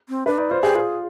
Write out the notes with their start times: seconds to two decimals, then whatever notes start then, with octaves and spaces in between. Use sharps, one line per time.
0.09 C4
0.26 D4 B4
0.38 D#4 D5
0.50 F4 C5
0.62 G4 G#4
0.75 F4 B4
0.80 G#4